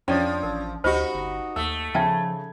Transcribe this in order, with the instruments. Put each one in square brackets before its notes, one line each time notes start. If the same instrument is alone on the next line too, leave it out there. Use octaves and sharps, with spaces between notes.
[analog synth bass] F2 [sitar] F3 [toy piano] C#4 A4 [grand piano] D4 C#5
[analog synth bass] A1 [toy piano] A#4
[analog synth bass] D2 [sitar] D#4 F#4 [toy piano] G4 C5 [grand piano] D#5 B5
[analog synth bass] G1
[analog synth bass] D#2 [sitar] A3 [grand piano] E6
[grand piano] C#3 G#6 [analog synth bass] F3 [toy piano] E5 G5 A5